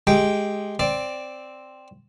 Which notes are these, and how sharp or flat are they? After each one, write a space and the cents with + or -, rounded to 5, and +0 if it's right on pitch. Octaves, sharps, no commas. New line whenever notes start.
G#3 +10 G4 +0 G5 +0
C4 +0 D5 +0